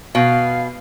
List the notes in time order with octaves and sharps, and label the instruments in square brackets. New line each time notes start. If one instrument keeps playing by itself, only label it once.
[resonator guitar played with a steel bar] B2 [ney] F5